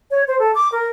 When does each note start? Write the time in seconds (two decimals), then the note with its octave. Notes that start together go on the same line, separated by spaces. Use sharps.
0.11 C#5
0.27 C5
0.39 A4
0.55 D6
0.72 A#4